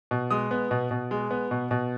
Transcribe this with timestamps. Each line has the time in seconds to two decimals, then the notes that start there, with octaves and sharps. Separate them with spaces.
0.11 B2
0.31 G#3 D#6
0.51 B3
0.71 B2
0.91 B2
1.11 G#3
1.31 B3
1.51 B2
1.71 B2